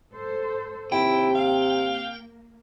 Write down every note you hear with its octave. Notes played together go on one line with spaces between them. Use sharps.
A4 C5
D#2 C3 E4 G5
A#3 F5